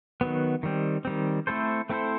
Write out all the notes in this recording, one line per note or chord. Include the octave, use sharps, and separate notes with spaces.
D#3 F#3 B3
D#3 G3 C4
D#3 G3 C4
A3 C4 E4 A4 C5
A3 C4 E4 A4 C5